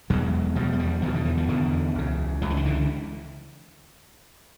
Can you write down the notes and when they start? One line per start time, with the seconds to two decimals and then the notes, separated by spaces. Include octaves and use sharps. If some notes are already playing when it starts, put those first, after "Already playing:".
0.10 E2 B2 F#3 G#3
0.55 E2 B2 F3 G3
0.72 G#3
0.79 F3 G3
1.02 E2 B2 D#3 F3
1.14 D3 E3
1.25 D3 E3
1.37 D#3 F3
1.48 E2 B2 D3 E3
1.95 C#2 C#3
2.42 C#2 C#3 F3
2.50 E3
2.57 D#3
2.65 D3 E3